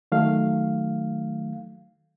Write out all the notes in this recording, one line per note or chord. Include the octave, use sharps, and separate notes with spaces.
D#3 F#3 A3 F5